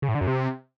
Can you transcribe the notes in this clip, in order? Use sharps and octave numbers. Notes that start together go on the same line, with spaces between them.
C#3
A2
D3
F#2
C3